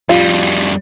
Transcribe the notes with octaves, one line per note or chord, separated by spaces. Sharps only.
F2 G3 F4